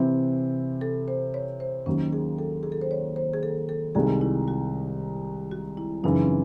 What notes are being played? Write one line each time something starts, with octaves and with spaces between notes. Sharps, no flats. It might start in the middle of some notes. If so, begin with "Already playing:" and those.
Already playing: C3 E3 C4 E4
A4
C5
C#5
C5
D#2 D#3 F#3 C#4
G#4
A4
G#4
A4
C5
C#5
C5
G#4
A4
A4
C2 C3 D#3 G#3 G#4
E4
F#4
F#4
E4
F#2 C#3 E3 D#4
C4